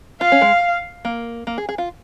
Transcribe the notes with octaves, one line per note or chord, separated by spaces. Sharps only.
F4 F5
C#4
G#3
A#3
A#3
G#4
G#4
F4